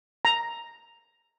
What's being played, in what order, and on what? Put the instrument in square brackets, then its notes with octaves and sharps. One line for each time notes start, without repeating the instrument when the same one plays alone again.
[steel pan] A#5